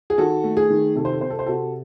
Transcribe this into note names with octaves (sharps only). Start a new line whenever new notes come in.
G#4
D#3 F#4 A4
A3
G#4
D#3
C3 A4
C5
A4
C3 C5
A4
C5
C3 F#4 A4